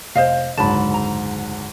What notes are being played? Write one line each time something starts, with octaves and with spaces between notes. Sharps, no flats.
F1 C5 D#5 F5
F#1 D2 G#2 A5 B5
A#5